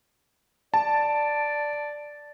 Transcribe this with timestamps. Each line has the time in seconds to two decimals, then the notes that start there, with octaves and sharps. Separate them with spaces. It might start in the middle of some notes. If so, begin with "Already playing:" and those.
0.74 D5 A5